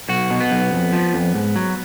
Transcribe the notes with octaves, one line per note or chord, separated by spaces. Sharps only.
B1 F#4
B2
B3
B1
F2
F3
F2
G#2
F#3